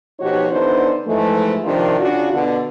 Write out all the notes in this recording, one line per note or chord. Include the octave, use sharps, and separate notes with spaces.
B2 F3 D#4 F#4 G4 C#5
D3 E3 B3 D4 D#4 C5
G#2 E3 F3 G#3 A3
C3 D#3 F3 D4 F4
C#3 D4 F4 F#4
B2 D3